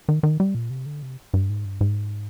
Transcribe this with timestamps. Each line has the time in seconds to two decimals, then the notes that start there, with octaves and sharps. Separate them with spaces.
0.09 D#3
0.23 D#3
0.40 G3
0.55 A#2
0.70 C3
0.86 D3
1.03 C3
1.34 G2
1.50 G#2
1.65 G2
1.81 G#2